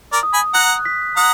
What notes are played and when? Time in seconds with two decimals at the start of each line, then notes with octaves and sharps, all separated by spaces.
0.13 A#4 D5
0.23 D#6
0.34 G#5 B5
0.54 F#5 A#5 F#6
0.85 B6
1.17 F#5 A#5 D#6